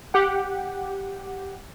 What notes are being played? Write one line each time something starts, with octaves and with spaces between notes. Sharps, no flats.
G4 F#5